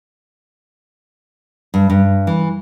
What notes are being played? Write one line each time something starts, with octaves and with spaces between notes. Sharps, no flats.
G2
G2
E3